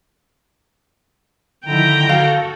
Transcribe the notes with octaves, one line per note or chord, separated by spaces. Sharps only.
D3 D#3 F3 E4 G5 A#5
F#4 A4 F5